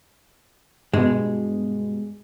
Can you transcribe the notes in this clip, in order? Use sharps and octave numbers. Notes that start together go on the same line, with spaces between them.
G2 B2 G#3